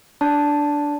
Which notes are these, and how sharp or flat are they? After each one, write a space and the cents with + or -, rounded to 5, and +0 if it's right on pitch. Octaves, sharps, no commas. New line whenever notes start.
D4 -5 D5 -25 A5 +0